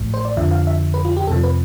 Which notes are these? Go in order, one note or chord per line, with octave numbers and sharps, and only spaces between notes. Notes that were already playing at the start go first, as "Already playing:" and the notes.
Already playing: A1 A2 F3
C5
D5
F2 D3 F3 E5
F5
E5
B4
F4
G4
F2 C3 F3 A4
B4